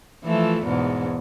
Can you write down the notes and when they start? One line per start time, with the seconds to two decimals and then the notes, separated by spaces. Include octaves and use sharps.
0.25 E3 F3 A3
0.64 E2 G#2 B2